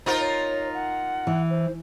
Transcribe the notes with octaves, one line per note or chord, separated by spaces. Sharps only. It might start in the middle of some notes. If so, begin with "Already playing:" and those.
D#4 F4 A#4 C5
C#5
F#5
E3
C5